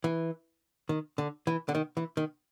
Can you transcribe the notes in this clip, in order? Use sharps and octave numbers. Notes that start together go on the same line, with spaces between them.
E3
D#3
D3
E3
D3
D#3
E3
D#3